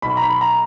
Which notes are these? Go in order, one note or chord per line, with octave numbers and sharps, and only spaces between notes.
B1 B2 B5
A#5
B5
A#5